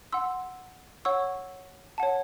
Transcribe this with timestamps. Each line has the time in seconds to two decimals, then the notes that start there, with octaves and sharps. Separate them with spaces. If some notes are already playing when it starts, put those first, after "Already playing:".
0.12 F#5 C6 E6
1.05 C#5 F#5 C#6 E6
1.98 C#5 F#5 A5